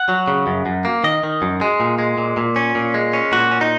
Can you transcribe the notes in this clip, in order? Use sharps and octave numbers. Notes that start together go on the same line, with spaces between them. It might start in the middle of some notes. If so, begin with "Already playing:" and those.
Already playing: F#5
F#3
C#3
F#2
F#2
A#3
D#3 D#5
D#3
F#2
G#3
A#2
G#3
A#2
A#2
C#4
A#2
G#3
C#4
A#2 F#4
C#4
D#4